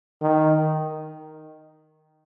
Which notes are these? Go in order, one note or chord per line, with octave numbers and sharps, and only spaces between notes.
D#3